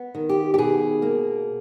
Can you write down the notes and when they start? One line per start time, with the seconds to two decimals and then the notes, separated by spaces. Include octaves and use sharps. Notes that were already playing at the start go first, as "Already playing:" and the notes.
Already playing: B3
0.15 D#3
0.29 G4
0.54 G4
0.58 B2 G#4
1.02 A#3